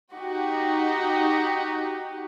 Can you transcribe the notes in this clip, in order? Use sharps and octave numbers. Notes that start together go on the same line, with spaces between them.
D#4 F#4 G4